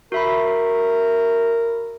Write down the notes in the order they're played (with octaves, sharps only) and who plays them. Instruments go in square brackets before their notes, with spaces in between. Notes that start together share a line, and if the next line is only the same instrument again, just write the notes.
[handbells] F#4 E5 B5 [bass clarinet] A#4